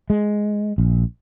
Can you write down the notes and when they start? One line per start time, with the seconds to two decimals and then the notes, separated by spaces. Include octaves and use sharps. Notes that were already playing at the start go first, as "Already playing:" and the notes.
0.10 G#3
0.78 A#1